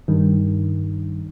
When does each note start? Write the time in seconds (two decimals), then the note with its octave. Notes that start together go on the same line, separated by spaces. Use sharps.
0.08 G2 D#3